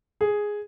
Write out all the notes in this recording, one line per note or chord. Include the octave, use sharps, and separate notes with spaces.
G#4